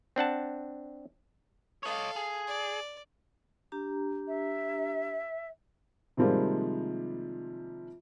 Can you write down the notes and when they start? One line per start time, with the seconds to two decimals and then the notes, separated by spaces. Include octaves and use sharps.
0.16 C4 D4 F#5 A5
1.83 A4 C#5 D#5 F5
2.16 G#4
2.47 D5
3.72 D4 G4 A#5
4.27 E5
6.17 C3 D#3 F3 G3 G#3 A#3